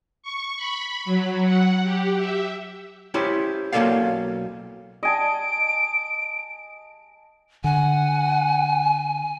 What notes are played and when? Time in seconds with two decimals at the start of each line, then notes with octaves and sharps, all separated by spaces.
0.23 C#6
0.57 B5
1.05 F#3
1.45 F#5
1.83 G4
2.17 E5
3.14 C#4 E4 G4 C5
3.72 B1 A#3 C#4 A4 D5 F5
5.03 D#5 G#5 A5 D7
7.64 D3 F#5 G#5